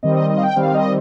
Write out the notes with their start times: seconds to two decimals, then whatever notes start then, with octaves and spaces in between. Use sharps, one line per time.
0.03 D#3 G3 C4 D#5
0.16 D#5
0.30 D#5
0.37 F5
0.43 G5
0.56 D#3 G3 C4 F5
0.74 D#5